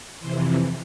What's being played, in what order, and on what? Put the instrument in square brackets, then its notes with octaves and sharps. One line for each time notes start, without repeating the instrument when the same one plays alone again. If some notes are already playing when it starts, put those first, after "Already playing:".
[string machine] F2 C3 E3 C5